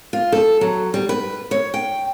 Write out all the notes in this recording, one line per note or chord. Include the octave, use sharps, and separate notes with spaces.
F4
A4
F#3
G3
B4
C#5
G5